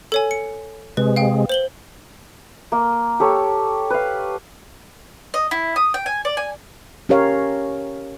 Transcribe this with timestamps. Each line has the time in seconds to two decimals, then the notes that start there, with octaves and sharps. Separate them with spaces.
0.12 A4 C#5 G#5
0.31 C#7
0.97 C3 G#3 B4
1.16 F5 G5
1.49 C5 F#7 G7
2.72 A#3
3.20 G4 A4 C#5
3.90 B4 F5
5.34 D#5
5.51 E4
5.76 D#6
5.94 G5
6.06 G#5
6.25 D5
6.37 G#5
7.09 C#4 G4 A#4 C#5 F5